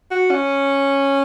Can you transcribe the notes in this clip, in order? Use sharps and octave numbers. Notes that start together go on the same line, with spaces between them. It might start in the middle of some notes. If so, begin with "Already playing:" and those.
F#4
C#4